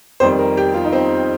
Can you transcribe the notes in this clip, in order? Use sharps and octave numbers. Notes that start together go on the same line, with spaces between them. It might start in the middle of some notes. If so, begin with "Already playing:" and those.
F2 D#3 G3 C5
A#4
G4
F4
D#4
C4